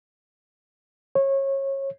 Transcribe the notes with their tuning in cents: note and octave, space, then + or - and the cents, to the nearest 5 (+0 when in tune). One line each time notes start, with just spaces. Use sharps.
C#5 -25